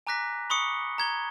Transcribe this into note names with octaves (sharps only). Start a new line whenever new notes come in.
G#5 A#5 D6 F#6 A#6 B6
B5 C#6 D#6 C#7 G7
A#5 G#6 G7